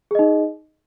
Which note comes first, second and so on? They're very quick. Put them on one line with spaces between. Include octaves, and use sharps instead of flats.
G#4 D#5 D#4